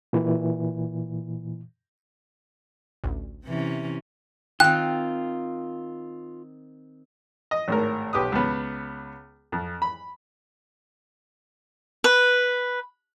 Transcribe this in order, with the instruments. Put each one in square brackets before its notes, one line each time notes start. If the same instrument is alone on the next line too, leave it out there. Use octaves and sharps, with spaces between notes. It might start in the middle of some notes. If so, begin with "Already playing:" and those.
[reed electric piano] A#2 E3
[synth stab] A1 D2
[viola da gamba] C3 E3 C#4
[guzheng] D#3 C4 [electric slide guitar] F4 [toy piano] G5 [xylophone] F#6
[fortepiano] D#5
G#1 A2 A#4
B1 G4 B4 D#6
C#2 B3
F2
B5
[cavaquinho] B4